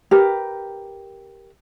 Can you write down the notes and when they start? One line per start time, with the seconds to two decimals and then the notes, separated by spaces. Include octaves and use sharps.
0.11 G4 A#4 B4